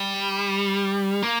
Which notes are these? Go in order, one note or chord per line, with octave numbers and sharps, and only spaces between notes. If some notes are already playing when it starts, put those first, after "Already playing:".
Already playing: G3
A#3